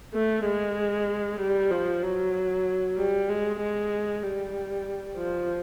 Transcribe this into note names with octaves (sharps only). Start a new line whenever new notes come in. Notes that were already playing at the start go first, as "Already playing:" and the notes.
A3
G#3
G3
F3
F#3
G3
G#3
G#3
G3
F3